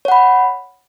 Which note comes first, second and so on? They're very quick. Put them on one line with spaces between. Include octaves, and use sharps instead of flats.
C#5 F#5 B5